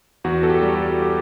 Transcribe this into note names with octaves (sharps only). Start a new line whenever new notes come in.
E2 F#4
A4
G4
G3
F#4
G4